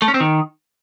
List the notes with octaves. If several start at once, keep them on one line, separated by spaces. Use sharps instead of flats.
A3
C#4
C4
D#3